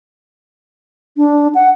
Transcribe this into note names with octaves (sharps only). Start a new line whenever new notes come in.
D4
F#5